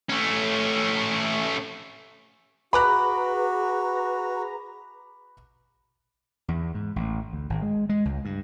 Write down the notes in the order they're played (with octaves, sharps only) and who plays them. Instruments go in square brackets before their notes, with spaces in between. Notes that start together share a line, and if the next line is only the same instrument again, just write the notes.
[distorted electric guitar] A3 C#4
[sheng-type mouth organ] F#4 [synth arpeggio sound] G#4 B4 A#5 [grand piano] B5 D6 F#6
[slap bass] E2
G#2
A1
D2
G#1
G#3
G#3
C#2
G2